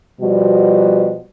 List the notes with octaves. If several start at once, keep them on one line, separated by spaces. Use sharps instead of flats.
B2 F3 G3 B3 F#4